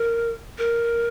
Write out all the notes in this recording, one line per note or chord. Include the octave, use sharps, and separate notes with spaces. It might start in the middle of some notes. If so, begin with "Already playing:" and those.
Already playing: A#4
A#4